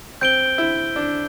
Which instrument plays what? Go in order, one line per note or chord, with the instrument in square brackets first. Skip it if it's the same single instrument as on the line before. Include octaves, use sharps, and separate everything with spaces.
[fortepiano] C4 [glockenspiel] G6 D7 G7
[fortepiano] E4
D4